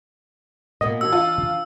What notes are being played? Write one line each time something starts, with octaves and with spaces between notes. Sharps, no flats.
A#2 A#3 B3 D#5
E3 D4 F#4 E6
F4